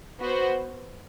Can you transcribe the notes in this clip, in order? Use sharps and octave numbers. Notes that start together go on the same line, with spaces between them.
B3 F#4 C5